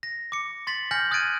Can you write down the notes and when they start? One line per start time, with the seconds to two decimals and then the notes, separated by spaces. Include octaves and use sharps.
0.03 A#6
0.32 D6 C#7
0.67 C6 A6 B6 F#7
0.91 G#5 F6 G6 A#6 C#7 F#7
1.11 D#6 F#6 G#6 A6 D7 D#7